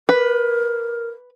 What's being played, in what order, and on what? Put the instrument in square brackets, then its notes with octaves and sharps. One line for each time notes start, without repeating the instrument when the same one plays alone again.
[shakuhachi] A#4 [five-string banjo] B4